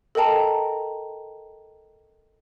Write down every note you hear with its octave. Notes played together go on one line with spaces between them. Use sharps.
A4 A#4 D#5 G5 A5 A#5